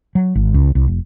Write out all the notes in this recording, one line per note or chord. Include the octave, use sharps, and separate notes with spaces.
F#3
G#1
C#2
C2
F1